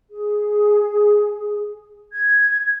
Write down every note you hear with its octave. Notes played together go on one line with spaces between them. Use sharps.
G#4
G#6